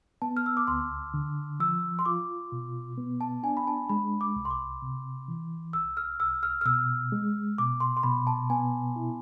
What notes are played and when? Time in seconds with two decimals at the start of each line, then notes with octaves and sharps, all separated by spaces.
0.22 B3 A5
0.37 F6
0.46 E6
0.57 D6
0.67 D2 C6
1.14 D3
1.60 F3 E6
1.99 C6
2.06 F4 D6
2.52 B2
2.98 B3
3.21 A5
3.43 D4 G#5
3.57 B5
3.67 A5
3.89 G#3 B5
4.21 D6
4.36 C2
4.45 C6
4.51 D6
4.82 C3
5.28 E3
5.73 C2 E6
5.97 F6
6.20 C2 E6
6.43 F6
6.61 F6
6.65 B2 E6
7.12 G#3
7.58 B2 D6
7.80 C6
7.97 C6
8.03 B2 B5
8.27 A5
8.50 B3 G#5
8.96 E4